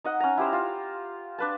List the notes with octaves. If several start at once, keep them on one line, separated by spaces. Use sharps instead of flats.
D#4 D#5 F#5
C#4 A#5
E4 G4 C5
F4
D4 B4 A5